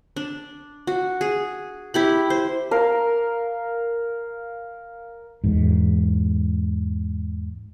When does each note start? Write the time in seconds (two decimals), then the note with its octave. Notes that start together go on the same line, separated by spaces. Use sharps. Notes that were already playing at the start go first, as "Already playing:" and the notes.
0.16 D4
0.87 F#4
1.21 G#4
1.94 E4 G4 B5
2.30 C5
2.71 A#4 F5
5.44 E2 G#2